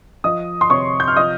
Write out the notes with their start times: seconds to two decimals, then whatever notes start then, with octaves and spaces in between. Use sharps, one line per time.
0.24 F3 D#5 D#6
0.61 C6
0.70 C3 C#5 C#6
1.00 G6
1.08 F6
1.16 F3 D#5 D#6